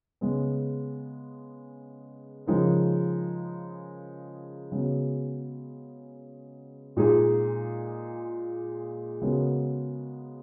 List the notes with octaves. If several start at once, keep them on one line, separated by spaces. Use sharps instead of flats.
C#3 G#3 B3
C#3 F3 G#3 D#4 A#4
C#3 G#3 B3 F#4
A#2 G#3 D#4 G#4
C#3 G#3 B3 F#4 A#4